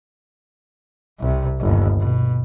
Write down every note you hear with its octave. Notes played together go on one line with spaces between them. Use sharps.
C2 C3
G1 D#2
B2